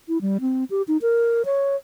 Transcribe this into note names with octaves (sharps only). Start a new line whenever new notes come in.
E4
G3
C4
G4
D#4
A#4
C#5